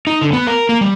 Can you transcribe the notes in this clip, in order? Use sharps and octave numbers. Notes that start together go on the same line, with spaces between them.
D#4
D3
B3
A#4
A#3
G3